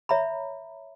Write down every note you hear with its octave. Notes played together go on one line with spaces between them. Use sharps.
C#5 E5 A#5 B5